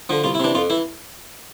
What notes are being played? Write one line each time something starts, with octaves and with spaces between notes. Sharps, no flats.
D3 F3
C2 F4
E4
C3 E3 D4
F2 F4
E3 E4